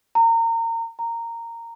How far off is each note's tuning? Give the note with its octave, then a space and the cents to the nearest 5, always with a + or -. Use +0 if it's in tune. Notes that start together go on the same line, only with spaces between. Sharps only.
A#5 -30
A#5 -15